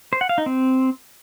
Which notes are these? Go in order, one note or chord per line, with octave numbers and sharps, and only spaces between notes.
C5
F#5
F5
D#4
C4